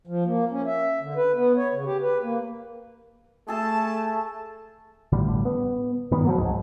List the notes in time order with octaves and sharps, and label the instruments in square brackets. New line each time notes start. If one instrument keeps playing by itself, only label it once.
[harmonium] F3
A#3
C#4
E5
D3
B4
B3
C#5
C#3
G4
B4
A#3
[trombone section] A3 [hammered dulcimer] G#4 A4 [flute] A5
[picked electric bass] A1 A2 D3 G3
B3
G2 D#3 B3
F3 F#3 A#3
C2 F2 G#2 G#3